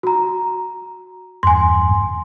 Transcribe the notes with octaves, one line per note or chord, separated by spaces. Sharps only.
F#4 A#5
E2 G2 G#5 C6